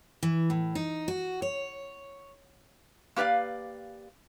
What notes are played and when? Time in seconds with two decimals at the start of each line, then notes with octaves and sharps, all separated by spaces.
0.23 E3
0.50 A2
0.75 D#4
1.08 F#4
1.42 C#5
3.16 A#3 G4 B4 D5 F5